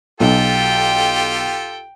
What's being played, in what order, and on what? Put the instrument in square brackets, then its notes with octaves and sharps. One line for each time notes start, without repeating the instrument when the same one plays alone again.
[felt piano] B1 [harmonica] F4 G4 A4 [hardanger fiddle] G5